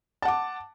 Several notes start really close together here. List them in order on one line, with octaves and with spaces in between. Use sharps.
A5 F#5 D6